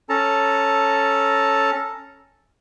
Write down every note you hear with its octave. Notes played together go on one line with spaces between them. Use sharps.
C#4 A4 A5 A#5